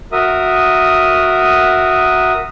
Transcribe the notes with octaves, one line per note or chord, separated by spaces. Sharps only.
F#4 A#4 E5 D#6